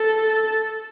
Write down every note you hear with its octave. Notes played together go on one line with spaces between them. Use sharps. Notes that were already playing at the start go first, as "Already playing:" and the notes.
Already playing: A4